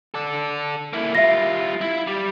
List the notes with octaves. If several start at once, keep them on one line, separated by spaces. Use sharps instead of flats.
A4 D5
A#3 E4
G3 F4 E5 A#6
E4
G3